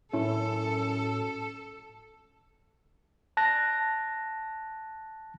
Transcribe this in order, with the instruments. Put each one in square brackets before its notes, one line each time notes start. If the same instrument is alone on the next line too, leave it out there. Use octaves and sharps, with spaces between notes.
[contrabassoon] F#2 [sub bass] A2 [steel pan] C#4 E4 [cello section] A4
[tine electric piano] A5 F#6 A#6